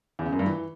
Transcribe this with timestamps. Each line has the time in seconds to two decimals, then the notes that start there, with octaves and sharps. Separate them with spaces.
0.19 E2
0.26 C#3
0.32 F#2
0.39 G2
0.46 E3